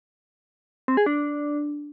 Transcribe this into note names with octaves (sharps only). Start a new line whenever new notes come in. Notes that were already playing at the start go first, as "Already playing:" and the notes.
C4
G#4
D4